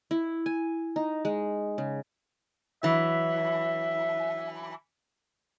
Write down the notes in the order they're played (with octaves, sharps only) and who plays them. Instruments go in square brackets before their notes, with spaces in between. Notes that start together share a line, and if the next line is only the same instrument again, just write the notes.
[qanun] E4
G#5
D#4
G#3
C#3
[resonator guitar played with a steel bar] E3 F#3 [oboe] E5